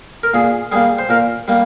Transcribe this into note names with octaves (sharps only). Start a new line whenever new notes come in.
A#4
A#2 G#4
G3 A#3 G#4
C5
A#2 A#4
G3 A#3